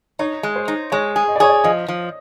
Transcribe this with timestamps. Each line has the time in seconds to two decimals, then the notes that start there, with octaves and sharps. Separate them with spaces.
0.19 D#4 C#5
0.43 G#3
0.56 C5
0.68 D#4
0.92 G#3 C#5
1.16 G#4
1.28 D#5
1.36 D5
1.40 G#4 C#5
1.49 D5
1.64 F3 D#5
1.88 F3